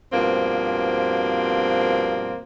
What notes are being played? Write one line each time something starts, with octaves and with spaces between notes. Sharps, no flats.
G2 B2 F3 A#3 C4